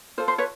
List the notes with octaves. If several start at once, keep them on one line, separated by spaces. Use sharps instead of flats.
F4 A4 C5
C5
B4 C#5